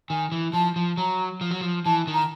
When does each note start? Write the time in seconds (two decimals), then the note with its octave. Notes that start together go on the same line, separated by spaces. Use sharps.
0.09 D#3 G#5
0.32 E3
0.53 F3 A5
0.76 F3
0.97 F#3 A#5
1.41 F3
1.51 F#3
1.61 F3
1.85 E3 A5
2.07 D#3
2.14 A#5